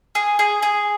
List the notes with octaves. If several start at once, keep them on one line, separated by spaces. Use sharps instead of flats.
G#4
G#4
G#4